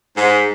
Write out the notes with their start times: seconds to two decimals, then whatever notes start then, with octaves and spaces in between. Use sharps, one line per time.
0.16 G#2